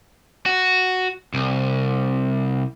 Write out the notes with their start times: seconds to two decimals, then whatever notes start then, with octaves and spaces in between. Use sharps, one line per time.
0.46 F#4
1.34 C2